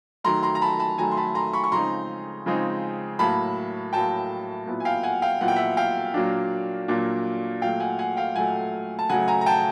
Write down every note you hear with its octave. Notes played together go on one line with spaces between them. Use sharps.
D#3 F#3 A3 A#5 C6
A#5 C6
A#5
A5 B5
A5 B5
D#3 F#3 A3 G#5 A#5
C6
A5 B5
A#5 C6
B5 C#6
C#6
C#3 F3 G#3 C4 D#4 A#5 C6
C#3 F3 G#3 C4 D#4
A2 F#3 A#3 A5 B5
A2 F#3 A#3 G5 A5
A#2 F#3 B3 E4
G#5
F5 G5
F#5 G#5
F5 G5
A#2 F#3 B3 E4 F#5
G5
E5 F#5
F5 G5
A#2 F#3 A#3 D4
A#2 F#3 A#3 D4
A#2 F#3 A3 F5 G5
F#5 G#5
F#5 G#5
F5 G5
A#2 F#3 A3 F#5 G#5
A5
C#3 F#3 A3 F#5 G#5
G#5 A#5
A#5
G5 A5